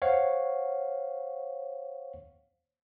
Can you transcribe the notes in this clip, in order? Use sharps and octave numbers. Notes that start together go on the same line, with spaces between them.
C5 C#5 F5 F#5